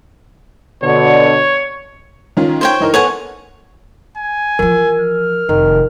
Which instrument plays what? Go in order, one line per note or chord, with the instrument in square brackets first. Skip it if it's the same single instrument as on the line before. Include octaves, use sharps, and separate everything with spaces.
[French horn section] B2 D3 [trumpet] C#5
[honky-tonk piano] D#3 C#4 F4
[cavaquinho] C5 C#5 G5
[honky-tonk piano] E3 D#4 A#4
[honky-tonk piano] B3 A4 [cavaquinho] C#5 F#5 G#5
[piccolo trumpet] G#5
[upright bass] E3 F3 [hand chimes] A#4
[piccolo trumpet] F6
[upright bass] F1 [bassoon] D#3